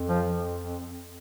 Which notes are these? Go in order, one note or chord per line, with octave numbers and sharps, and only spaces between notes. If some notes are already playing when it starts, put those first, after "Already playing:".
Already playing: F2
F3